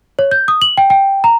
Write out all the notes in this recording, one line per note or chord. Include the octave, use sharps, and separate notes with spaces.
C#5
G6
D#6
F#7
G5
G5
A#5